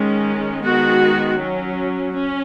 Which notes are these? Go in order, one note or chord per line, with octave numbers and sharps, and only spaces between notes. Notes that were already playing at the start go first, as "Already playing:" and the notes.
Already playing: D#3 G#3 C#4
D#3 G#3 B3 F#4
F#3 C#4
C#4